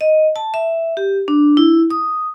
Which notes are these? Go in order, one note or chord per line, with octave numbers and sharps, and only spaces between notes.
D#5
A5
E5
G4
D4
E4
D#6